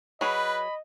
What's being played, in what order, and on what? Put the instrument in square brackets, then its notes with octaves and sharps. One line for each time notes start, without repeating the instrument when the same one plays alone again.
[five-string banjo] F#3 G#4 [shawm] B4 [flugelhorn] D#5 [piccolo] B5